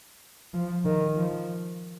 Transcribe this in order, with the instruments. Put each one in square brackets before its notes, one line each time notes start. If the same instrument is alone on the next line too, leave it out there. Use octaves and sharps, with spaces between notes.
[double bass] F3
D#3
F3